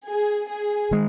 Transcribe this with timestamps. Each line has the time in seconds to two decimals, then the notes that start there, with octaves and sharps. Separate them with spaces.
0.09 G#4
0.49 G#4
0.91 D#3 G#3